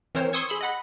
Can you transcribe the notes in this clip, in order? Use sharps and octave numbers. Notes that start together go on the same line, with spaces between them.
E3 C4 A#4 C5 C#5
C6 C#6 D#6 E6 G#6 C#7
G#4 B5 C6 E6
D#5 F#5 B5